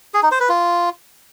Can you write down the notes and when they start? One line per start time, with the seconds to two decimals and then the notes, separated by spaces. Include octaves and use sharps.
0.14 G#4
0.23 D#4
0.31 C5
0.40 B4
0.49 F4